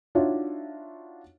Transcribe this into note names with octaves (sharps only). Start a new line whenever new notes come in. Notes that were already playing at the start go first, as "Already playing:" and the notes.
D4 D#4 F4 F#4 C#5 E5